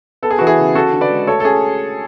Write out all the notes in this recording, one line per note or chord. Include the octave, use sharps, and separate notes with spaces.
B3 A4
G#4
E3 F#4
E4 G#4
C#3
C#4 F#4 A4
D3
B4 D5
G#3
A3 A4 C#5
A4
C#4 G#4